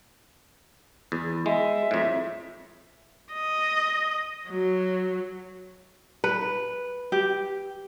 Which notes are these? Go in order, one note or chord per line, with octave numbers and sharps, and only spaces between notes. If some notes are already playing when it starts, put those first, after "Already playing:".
E2
G#3 E5
F2 A2
D#5
F#3
B4
G4